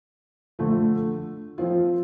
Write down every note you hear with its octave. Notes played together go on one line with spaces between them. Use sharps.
D3 F3 A3
F3 C4 F4